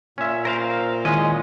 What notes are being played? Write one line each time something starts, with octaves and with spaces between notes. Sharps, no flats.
A#2 C#4 E5
A#4 C5 F5
D#3 G#3 C#4 E4 D#5